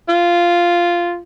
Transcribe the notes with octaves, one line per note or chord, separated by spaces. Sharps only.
F4